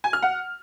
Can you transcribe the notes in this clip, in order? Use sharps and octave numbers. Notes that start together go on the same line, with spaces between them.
G#5
F6
F#5